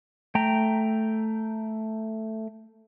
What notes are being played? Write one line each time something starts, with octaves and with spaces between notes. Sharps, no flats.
A3 G5 A#5